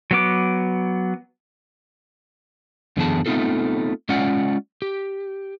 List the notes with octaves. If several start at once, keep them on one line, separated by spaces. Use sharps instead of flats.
F#3 B3 D6
F#2 D3 E3 B3 G#4 A5
A3 B3 C4 D#4 F4 A4
G#3 C#4 F4 D5 F#5
G4